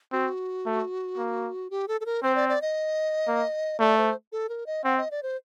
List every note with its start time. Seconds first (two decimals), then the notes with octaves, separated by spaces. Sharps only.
0.13 C4 F#4
0.66 A3
1.17 A#3
1.70 G4
1.88 A4
2.01 A4
2.06 A#4
2.23 C4 C5
2.35 D5
2.49 D5
2.62 D#5
3.28 A#3
3.79 A3 D5
3.97 C5
4.32 A4
4.49 A#4
4.66 D#5
4.84 C4 F#5
4.97 D#5
5.11 D5
5.23 C5